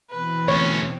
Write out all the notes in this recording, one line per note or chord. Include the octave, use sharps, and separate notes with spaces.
B2 E3 C4 B4
D2 C#4 C#5